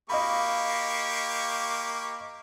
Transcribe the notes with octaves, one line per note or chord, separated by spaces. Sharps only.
A#3 G4 D#5 F5 B5 C#6